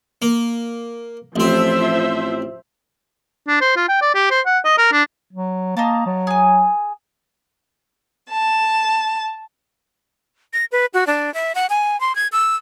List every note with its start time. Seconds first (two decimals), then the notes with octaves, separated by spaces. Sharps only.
0.22 A#3
1.36 A1 F3 C4 C5 E5
3.48 D4
3.61 C5
3.76 F4
3.88 G5
4.02 D5
4.15 G4
4.31 C5
4.46 F#5
4.65 D#5
4.78 A#4
4.92 D4
5.33 F#3
5.77 A#3 D#5 F5 A5
6.06 F#3
6.27 G#4 G#5
8.31 A5
10.53 A#6
10.72 B4
10.94 F#4
11.07 D4
11.34 E5
11.55 F#5
11.70 G#5
12.00 C6
12.15 G#6
12.32 E6